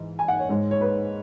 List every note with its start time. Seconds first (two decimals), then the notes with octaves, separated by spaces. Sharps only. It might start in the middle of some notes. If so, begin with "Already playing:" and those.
Already playing: G#2 E3
0.19 G#5
0.28 F#5
0.39 C#5
0.49 G#2 G#3 C#5
0.71 C#5
0.81 B4